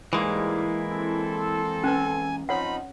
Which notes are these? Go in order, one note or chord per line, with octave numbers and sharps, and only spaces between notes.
G#2 E3 G3 G#3 A#3 E4
C4 A4
C#4 B4 G#5
F3 C4 D#4 C#5 F#5 B5